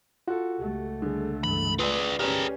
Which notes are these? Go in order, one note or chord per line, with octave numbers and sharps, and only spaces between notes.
F4 F#4 A4
C#2 A3 G4
D3 G3 G#4
G2 E3 B5
F4 G#4 B4 D5
C#4 G4 G#4 A#4